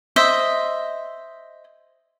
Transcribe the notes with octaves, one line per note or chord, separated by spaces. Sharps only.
C5 D#5 E5